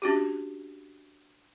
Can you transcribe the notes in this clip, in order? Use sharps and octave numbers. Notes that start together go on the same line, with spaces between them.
C#4 D4 F#4 G4